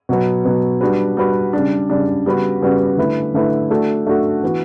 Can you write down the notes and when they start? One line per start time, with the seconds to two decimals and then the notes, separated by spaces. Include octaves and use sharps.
0.09 B2 F#3 B3
0.45 B2 F#3 B3
0.81 G3 D4 F#4 B4
1.17 G3 D4 F#4 B4
1.53 C#3 G3 D4
1.90 C#3 G3 D4
2.26 C#3 G3 B3 F#4 B4
2.61 C#3 G3 B3 F#4 B4
2.98 D3 A3 E4 B4
3.34 D3 A3 E4 B4
3.70 A3 D4 F#4 A4
4.07 A3 D4 F#4 A4
4.43 E3 B3 F#4